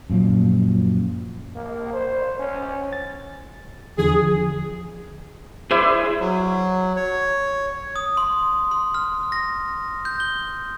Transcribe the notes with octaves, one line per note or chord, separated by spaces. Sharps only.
F#2 A#2 F3
A#3
C5
C#4
A6
E2 D3 F3 G#4
E4 G#4 C5 D5 E5
F#3
C#5
D#6
C6
C6
F6
A#6
G6
G7